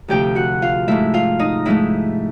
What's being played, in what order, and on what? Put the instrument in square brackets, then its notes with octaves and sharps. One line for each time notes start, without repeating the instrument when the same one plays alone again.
[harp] D2 C3 F3 A3 G4 G5
F#4 F#5
F4 F5
G#2 F3 A3 E4 E5
F4 F5
D#4 D#5
G#2 F3 A3 E4 E5